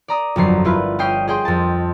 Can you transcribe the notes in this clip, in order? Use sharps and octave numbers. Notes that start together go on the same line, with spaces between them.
D5 A#5 D#6
G1 F2 F#3 C7
E4 F4 B4
C#4 D#5 G5 C7 D#7
G#4 D#5 G5 C6
F2 A5